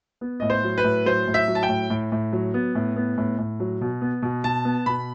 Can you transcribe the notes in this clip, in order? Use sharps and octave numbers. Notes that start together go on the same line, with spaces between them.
B3
A2 D#5
C5
F#3
B4
A2
F#3 C5
A2
E5
F#3
A5
G5
A2
A2
A2
F#3
B3
A2
B3
A2
A2
F#3
B2
B3
B2
B2 A5
B3
B2 B5